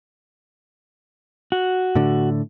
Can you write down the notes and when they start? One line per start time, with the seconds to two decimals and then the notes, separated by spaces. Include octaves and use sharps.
1.52 F#4
1.95 A2 D3